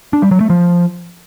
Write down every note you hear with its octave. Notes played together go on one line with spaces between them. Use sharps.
D4
G3
F#3
A3
F3